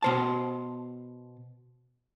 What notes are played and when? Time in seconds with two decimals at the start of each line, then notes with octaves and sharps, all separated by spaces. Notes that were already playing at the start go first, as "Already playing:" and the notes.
0.02 B2 C5 A5